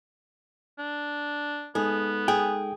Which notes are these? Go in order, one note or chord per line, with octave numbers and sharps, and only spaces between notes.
D4
G#3 B3 D#4 G#4 A4
G#4 G5